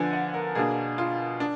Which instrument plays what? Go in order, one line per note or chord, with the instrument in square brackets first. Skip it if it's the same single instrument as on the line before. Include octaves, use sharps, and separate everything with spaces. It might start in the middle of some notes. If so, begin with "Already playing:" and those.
Already playing: [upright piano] D3 F3 B3 D4 F#5 G#5
F#5
A#4
B2 A#3 D4 G#4
F4
D4